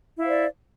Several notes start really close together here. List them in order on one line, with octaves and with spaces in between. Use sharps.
E4 F5 C5 D5